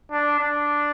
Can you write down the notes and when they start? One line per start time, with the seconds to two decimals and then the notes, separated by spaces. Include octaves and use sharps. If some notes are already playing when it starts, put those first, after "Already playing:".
0.11 D4
0.40 D4